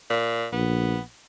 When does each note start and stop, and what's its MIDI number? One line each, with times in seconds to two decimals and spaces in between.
0.10 0.46 46
0.53 0.98 34
0.53 1.00 59